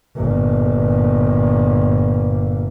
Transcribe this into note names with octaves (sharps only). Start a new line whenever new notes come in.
G1 A#2